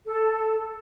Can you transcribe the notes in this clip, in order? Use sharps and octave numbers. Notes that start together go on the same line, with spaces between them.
A4